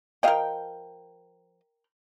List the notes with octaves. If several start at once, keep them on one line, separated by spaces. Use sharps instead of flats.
F3 A#4 D#5 F5 G5